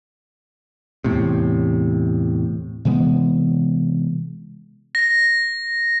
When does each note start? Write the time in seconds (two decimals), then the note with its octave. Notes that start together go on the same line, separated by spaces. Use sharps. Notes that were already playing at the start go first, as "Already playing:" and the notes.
1.04 E2 A2 C3
2.85 C3 E3 G#3 B3
4.95 A#6